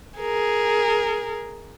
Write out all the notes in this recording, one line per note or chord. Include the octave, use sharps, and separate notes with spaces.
G#4 A#4